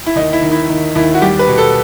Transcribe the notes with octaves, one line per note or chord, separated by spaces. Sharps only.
E4
D#2 D#4
E4
D#3
E4
D#3
D#2 E4
F#4
G3 G4
B4
B2
A4